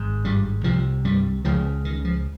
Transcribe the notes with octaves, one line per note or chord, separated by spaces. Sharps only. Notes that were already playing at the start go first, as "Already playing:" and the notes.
Already playing: G#1 G#2
G2 G3
C2 C3 F3
G2 G3
C#2 C#3 F3
D#3
F3